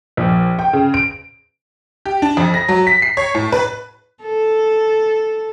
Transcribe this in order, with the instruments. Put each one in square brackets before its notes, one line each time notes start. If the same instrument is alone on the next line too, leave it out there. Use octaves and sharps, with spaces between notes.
[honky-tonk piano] A#1
G5
C#3
D7
G4
D4
F2
A#6
F#3
B6
C7
C#5
A2
B4
[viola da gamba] A4